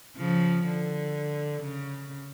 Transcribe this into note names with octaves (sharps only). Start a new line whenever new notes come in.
C#3 F3
D3
C#3